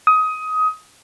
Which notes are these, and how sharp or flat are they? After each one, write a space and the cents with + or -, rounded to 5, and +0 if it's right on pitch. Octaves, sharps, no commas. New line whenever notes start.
D#6 +20